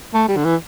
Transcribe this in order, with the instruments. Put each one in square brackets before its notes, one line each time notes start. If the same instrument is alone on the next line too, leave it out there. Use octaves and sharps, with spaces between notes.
[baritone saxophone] A3
G3
D3
E3